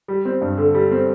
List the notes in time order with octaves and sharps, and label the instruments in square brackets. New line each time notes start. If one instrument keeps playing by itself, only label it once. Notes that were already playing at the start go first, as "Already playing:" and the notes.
[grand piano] G3
C4
G2
D3
G3
C4